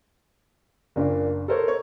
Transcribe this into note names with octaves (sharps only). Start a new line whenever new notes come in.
F#1 A#2 D4
A4 A#4 C5 C#5
C#5